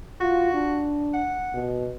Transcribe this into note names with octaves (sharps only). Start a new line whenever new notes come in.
F4 F#4
D4
F#5
B2